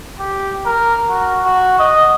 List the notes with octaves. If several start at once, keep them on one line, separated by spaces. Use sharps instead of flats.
G4
A#4
F#4
F#4
D#5